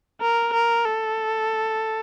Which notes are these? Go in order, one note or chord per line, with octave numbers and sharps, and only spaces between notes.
A#4
A#4
A4